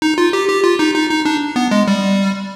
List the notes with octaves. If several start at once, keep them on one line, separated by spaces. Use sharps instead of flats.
D#4
F4
G4
G4
F4
D#4
D#4
D#4
D4
B3
G#3
G3